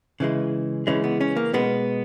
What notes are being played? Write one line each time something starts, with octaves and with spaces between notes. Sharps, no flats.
C#3 E3 G#3
C#3 E3 G#3 C#4
B3
C#4
A#3
B2 G#3 B3